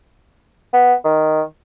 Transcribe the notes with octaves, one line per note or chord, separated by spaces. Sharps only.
B3
D#3